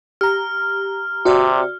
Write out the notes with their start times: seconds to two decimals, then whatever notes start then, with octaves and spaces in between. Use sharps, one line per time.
0.21 G4 A#5 F6
1.25 C3 F#4 D5